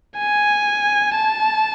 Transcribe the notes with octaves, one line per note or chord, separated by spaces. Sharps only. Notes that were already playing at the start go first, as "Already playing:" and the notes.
G#5
A5